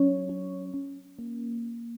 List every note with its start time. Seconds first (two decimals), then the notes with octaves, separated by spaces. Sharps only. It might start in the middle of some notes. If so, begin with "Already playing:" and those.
Already playing: F#3 C#4 C#5
0.29 C#4
0.74 C#4
1.19 A#3